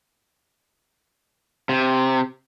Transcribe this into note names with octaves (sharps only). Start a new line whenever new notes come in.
C3